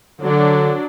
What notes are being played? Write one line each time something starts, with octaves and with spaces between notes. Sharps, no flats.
D3 F#3 D4